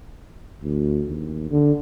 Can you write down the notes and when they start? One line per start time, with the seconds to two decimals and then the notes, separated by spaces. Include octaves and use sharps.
0.62 D2
1.08 D#2
1.51 D3